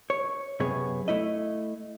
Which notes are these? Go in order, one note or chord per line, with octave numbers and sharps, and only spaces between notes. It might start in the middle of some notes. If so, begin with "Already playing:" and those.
C#5
F#2 C3 B3 G#4 C#5
A3 E4 D#5